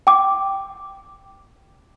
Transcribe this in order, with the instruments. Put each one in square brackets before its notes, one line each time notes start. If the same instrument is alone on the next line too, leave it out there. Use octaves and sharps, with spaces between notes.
[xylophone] G5 D6